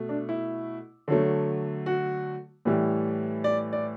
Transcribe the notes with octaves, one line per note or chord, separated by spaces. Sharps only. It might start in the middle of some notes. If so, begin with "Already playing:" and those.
Already playing: B2 A3
D4
E4
D3 F#3 A3
F#4
A2 E3 G3
D5
D5